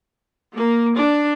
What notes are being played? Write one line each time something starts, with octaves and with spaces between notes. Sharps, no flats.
A#3
D4